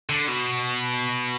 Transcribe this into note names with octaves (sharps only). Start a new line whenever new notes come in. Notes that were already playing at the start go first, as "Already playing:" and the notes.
D3
B2